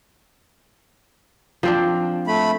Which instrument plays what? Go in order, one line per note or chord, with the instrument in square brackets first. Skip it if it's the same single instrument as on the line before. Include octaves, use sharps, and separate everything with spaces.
[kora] F3 C4 D4
[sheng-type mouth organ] A3 B5